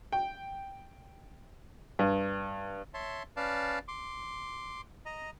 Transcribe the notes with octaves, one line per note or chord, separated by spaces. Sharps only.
G5
G2
C#5 E5 A5 C6
C#4 B4 D5 F5 A5
C6 D6
D#5 A#5